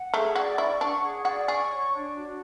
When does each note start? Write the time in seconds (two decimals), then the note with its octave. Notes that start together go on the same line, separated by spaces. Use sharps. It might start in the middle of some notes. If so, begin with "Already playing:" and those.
Already playing: F#5
0.13 A3 G#4
0.36 F#4 D5
0.58 E4 C#6
0.81 D4 F#5
1.03 G#4
1.25 F#4 D5
1.48 G#4 C#6
1.70 C#5
1.93 D4
2.15 F#4